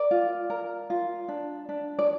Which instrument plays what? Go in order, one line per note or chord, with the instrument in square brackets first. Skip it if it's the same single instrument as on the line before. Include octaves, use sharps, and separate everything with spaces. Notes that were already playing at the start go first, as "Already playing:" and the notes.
Already playing: [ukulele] A#4 D5
F4
A#4
F4
D4
D4
D5